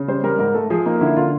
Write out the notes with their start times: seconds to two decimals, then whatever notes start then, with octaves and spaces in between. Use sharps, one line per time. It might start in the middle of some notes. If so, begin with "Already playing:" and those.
Already playing: C#3
0.08 G3 C5
0.24 G3 A#4
0.39 G#2 A#4
0.54 A3 A4
0.70 F3 G#4
0.86 A#3 D#4
1.01 D3 E4
1.17 D3 F4